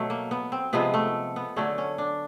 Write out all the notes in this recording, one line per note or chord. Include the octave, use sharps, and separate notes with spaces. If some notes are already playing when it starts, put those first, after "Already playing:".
Already playing: B2 F#3 A3
A#3
B3
C4
C3 F3 G#3 B3
A3
B3
D3 F#3 A3 C#4
C#4
D4